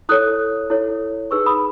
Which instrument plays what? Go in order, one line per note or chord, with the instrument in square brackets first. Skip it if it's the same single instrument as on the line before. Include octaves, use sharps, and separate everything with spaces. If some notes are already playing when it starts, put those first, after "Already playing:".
[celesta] E4 A4 C#5 D#6 F#6
E4 A4 C#5
D#4 G#4 B4 C#6 E6
B5 D#6